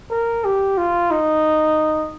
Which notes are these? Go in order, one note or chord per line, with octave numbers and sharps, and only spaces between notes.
A#4
G4
F4
D#4